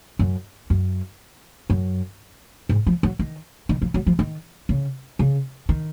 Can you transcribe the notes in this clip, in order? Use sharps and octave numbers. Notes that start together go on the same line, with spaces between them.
F#2
F#2
F#2
G#2
F3
F#3
D#3
D#3
F3
F#3
F3
D#3
C#3
C#3
D#3